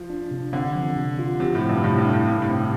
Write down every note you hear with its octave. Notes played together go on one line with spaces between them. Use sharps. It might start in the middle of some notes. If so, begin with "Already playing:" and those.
Already playing: F3
D4
C3
D3 C4
F3
C3
F4
C3 F3
A2
F3
G2
A2 C3
G2
D4
A2
G2 C3
A2
C4